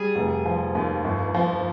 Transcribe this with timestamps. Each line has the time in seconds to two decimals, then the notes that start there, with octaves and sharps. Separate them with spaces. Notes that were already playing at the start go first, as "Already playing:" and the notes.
Already playing: G3 G#4
0.15 F1
0.46 F3
0.75 D#2
1.04 G1
1.34 F3